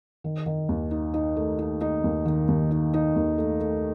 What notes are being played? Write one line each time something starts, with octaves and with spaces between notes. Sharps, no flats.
D#3
D#3
D#2
D#4
D#4
A3
D#4
D#4
D#2
D#3
D#2
D#4
D#4
D#2
A3
A3